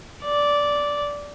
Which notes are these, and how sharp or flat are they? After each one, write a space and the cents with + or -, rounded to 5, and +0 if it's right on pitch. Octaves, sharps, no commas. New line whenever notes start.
D5 -10